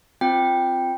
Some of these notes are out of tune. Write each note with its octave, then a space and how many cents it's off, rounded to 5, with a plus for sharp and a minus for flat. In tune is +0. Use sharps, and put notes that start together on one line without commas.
C4 +0 F4 +0 G5 +0